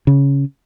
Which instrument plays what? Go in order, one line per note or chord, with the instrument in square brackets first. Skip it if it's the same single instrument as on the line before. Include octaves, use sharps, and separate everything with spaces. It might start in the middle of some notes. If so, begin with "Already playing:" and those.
[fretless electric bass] C#3